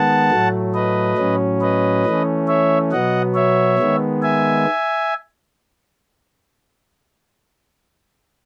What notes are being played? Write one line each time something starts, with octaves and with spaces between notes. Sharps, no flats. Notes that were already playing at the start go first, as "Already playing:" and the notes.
Already playing: D#3 G#3 B3 F#5 A5
A2 F#3 A3
B4 D#5
A2 F#3 C#4
B4 D#5
E3 A3 C#4
C#5 E5
B2 F#3 B3 D#5 F#5
C#5 E5
D#3 G#3 B3
E5 G#5